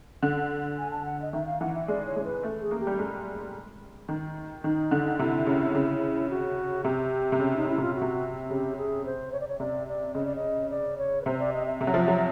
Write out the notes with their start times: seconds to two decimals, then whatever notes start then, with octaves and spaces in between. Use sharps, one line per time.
0.23 D3
0.78 G#5
0.91 A5
1.05 F#5
1.22 D#5
1.33 D#3 E5
1.46 F5
1.61 E3 F#5
1.74 E5
1.88 G#3 D5
2.06 C#5
2.16 G#3
2.24 B4
2.44 A3
2.61 G#4
2.71 A#3
2.80 G4
2.87 G3
2.99 G#3
4.09 D#3
4.64 D#3 D#4
4.91 D3
5.19 C3 E4
5.47 C#3
5.75 C#3
6.30 F#4
6.85 C3 G4
7.32 C3
7.40 C#3
7.56 D#4
7.67 C#3 E4
7.78 C3 F4
7.95 F#4
8.01 C3
8.49 C#3 G4
8.77 G#4
9.05 C5
9.32 C#5
9.41 D5
9.48 C#5
9.60 C3 D5
9.88 D5
10.15 C#3 D#5
10.26 D5
10.36 D#5
10.70 D5
10.98 C#5
11.22 B4
11.26 C3 C5
11.39 D5
11.54 D#5
11.67 E5
11.80 C3 E5
11.87 F#3
11.94 F3
12.08 F#3